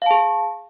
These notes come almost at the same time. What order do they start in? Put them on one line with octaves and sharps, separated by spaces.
F5 A5 G#4